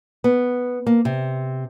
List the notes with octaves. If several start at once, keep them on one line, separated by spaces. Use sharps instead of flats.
B3
A#3
C3